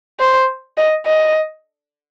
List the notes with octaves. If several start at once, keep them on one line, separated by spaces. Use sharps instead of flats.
C5
D#5
D#5